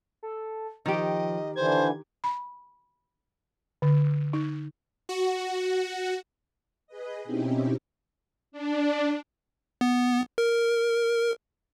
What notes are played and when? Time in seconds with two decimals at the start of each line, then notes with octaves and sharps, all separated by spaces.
0.23 A4
0.86 D#3 F3 G4 D#5
1.56 D3 E3 C5 G#6
2.24 B5
3.82 D3
4.33 D#4
5.09 F#4
6.87 G#4 B4 D#5
7.24 B2 C4 C#4 D#4 E4 G4
8.52 D4
9.81 B3
10.38 A#4